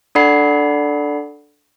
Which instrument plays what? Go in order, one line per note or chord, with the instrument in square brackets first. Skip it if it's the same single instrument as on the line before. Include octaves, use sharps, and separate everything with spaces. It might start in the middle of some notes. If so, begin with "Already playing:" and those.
[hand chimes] D4 A4 D5 F#5 B5 C7